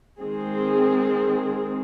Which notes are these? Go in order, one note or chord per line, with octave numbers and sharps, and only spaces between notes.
D#3 G#3 C4 G#4